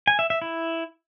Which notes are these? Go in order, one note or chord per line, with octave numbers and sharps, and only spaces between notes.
G#5
E5
E5
E4